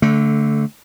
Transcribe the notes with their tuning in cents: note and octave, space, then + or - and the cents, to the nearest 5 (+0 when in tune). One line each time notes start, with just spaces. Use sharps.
D3 -20 A3 +0